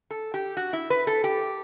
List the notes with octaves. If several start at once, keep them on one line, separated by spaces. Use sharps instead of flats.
A4
G4
F#4
E4
B4
A4
G4